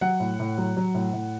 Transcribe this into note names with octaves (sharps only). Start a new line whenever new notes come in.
F#3 F#5
A2
A2
F#3
F#3
A2
A2